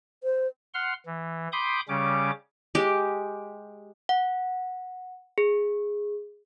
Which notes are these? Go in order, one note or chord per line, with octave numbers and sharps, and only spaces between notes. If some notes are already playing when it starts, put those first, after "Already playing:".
C5
F#5 C6 F6
E3
G5 B5 C6 D6 D#6 G6
C#3 G3 C#4 D6
G#3 G4
F#5
G#4